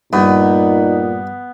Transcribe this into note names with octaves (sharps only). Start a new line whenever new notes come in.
G2 A#2 B3 D#4